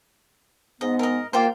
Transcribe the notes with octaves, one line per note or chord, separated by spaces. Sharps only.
G#2 B3 D#5
A#4 D#5
A#3 F4 G4 C5